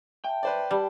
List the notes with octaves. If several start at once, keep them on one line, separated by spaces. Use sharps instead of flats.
E5 G5 A5
B4 C5 D5
G3 A5